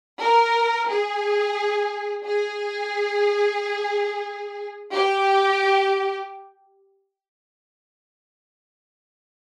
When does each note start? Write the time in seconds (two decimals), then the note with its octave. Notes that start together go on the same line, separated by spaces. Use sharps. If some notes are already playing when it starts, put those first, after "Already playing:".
0.22 A#4
0.89 G#4
2.24 G#4
4.92 G4